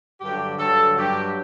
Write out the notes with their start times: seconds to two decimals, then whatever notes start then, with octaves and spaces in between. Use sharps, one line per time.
0.21 G2 D3 F#3 G4
0.58 G2 D3 F#3 A4
0.96 G2 F#3 G4